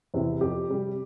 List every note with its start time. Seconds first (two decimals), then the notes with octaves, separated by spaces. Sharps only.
0.14 E2 C3
0.41 F2 G4
0.68 C3 G3